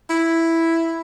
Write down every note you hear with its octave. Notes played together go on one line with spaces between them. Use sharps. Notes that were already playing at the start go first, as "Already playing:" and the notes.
E4